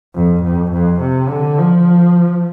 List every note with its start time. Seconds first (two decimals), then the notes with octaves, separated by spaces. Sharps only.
0.15 F2
0.43 F2
0.72 F2
1.01 C3
1.29 D3
1.58 F3